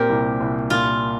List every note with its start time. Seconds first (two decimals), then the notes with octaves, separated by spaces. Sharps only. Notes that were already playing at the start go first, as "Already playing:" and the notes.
Already playing: A#2 C4 G4 A#4
0.10 C2
0.41 C2
0.70 A#2 F4